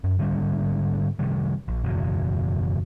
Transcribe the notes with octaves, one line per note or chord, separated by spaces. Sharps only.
F#2
G#2 D3 G3 C#4
C3 D#3 G3
A#1
F#1 E2 B2